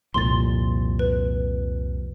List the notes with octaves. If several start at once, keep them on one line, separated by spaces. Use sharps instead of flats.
C2 F2 A#2 C6 A6
B4